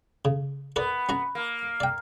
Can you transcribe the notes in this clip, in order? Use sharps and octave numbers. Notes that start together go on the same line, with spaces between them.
C#3
B3 A#4 B4 D5
C#4 F#4 A#5
A#3
D5 G5